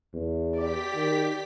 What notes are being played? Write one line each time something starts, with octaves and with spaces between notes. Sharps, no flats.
E2
G4 D5 B6
D#3